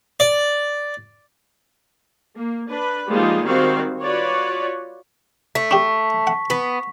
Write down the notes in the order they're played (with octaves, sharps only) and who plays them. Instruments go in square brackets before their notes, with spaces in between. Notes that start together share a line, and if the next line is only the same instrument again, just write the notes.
[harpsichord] D5
[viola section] A#3
D4 B4
F3 G3 G#3 A#3 D#4 F4
D#3 G3 C4 F#4 F5
F4 F#4 B4 C#5 D5
[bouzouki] A3 [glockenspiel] B6
[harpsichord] D4 G4 [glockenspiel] C#6
[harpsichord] F#5
[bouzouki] B3 [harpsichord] B5